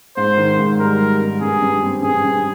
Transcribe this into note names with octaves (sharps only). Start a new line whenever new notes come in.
G#2 C5
D#3
G#2
G3 A#4
G3
G#2
G2 G#4
G2
C4
G2 G#4
G2